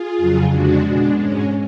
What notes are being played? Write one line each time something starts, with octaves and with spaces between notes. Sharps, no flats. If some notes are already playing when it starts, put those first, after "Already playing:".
Already playing: F4 G#4
F2 C#3 F#3
F2 D3 G#3 D4 F#4
B2 G#3 D4
G#2 G#3 C#4